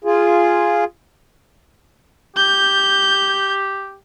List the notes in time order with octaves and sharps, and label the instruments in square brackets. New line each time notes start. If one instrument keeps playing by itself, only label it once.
[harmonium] F4 G#4
[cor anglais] G4 [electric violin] G6